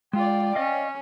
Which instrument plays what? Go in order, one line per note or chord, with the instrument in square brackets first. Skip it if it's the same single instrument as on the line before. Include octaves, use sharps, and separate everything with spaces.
[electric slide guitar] G#3 [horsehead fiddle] F4 D5 [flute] G5
[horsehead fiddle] C#4 [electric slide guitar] D5 D#5 F5